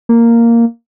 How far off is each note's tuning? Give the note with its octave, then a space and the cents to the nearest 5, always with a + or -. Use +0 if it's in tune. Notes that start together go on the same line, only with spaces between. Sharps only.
A#3 -5